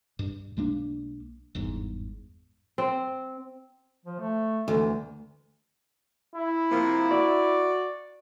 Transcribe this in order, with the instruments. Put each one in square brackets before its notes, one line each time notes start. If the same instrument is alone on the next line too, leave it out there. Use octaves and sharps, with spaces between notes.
[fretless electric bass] G2
B1 G#3 A#3 D4
G1 E2 G#2
[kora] C4
[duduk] F3
A3
[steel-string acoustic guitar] D2 [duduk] E3
[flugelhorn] E4
[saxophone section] C3 F3 A#3
F#4 D5